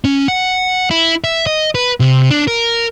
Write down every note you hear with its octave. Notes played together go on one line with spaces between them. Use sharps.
C#4
F#5
E4
E5
D#5
B4
C3
D4
A#4